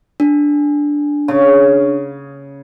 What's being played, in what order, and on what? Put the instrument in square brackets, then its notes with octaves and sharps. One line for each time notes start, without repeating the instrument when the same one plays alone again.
[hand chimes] D4
[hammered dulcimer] C#3